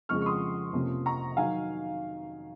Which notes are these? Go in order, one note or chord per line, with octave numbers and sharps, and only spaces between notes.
F2 C#3 F3 G#3 C4 C#6 F6
C#6
C6 D#6
F2 C3 F3 A#3 C#4
A#5 C#6
D#3 F#3 F5 G#5